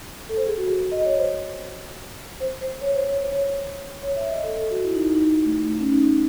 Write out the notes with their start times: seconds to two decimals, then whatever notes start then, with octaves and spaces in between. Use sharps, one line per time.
0.29 A4
0.37 C5
0.47 G#4
0.57 F#4
0.68 G#4
0.92 D#5
1.05 C#5
1.18 C5
2.40 C5
2.61 C5
2.82 C#5
2.95 C5
3.08 C#5
3.20 C5
3.32 C#5
4.03 C#5
4.16 E5
4.30 D#5
4.43 A4
4.56 A4
4.70 F#4
4.84 E4
4.95 D#4
5.15 D#4
5.45 A3
5.65 A3
5.79 C#4
5.92 D#4